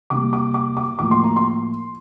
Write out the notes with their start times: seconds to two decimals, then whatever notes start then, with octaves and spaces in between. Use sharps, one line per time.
0.10 C3 G3 A#3 D6
0.33 D6
0.54 D6
0.77 D6
0.99 A2 F3 A#3 D6
1.11 C6
1.24 A#5
1.36 C6